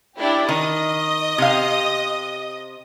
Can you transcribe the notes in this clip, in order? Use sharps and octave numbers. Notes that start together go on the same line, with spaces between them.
D4 E4 G4
D#3 D#5 D#6
C3 F5